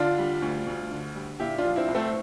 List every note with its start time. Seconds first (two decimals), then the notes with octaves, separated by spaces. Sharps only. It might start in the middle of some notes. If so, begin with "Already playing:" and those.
Already playing: D3 D4 F4
0.18 G3
0.42 D2
0.67 D2
0.91 D3
1.15 G3
1.40 A#2 E4 G4
1.58 D4 F4
1.65 F3
1.76 C4 E4
1.88 C2
1.95 A3 C4